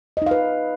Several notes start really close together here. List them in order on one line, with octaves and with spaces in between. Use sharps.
D#5 D#4 F5 B4